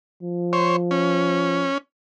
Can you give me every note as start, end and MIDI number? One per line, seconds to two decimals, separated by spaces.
0.23 1.69 53
0.53 0.76 72
0.53 0.76 73
0.91 1.78 61